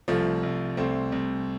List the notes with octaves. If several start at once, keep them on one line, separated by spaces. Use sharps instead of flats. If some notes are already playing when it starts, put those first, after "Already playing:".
C2 F3 A3
C2
C2 A3 C4
C2